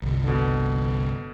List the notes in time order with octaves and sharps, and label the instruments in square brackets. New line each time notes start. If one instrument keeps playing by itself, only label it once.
[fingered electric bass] G1 C2
[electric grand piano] B2 D3